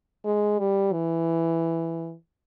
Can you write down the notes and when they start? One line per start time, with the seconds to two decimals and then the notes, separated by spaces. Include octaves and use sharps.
0.25 G#3
0.59 G3
0.92 E3